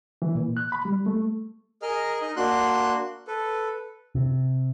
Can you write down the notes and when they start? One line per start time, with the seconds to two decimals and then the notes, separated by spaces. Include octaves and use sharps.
0.22 E3
0.35 A#2
0.57 F#6
0.72 B5
0.85 G3
1.06 A3
1.82 G#4 A#4 D#5 F6
2.22 D#4 D#5
2.36 A#3 D4 F#4 C6 F#6
3.27 A4 B4
4.15 C3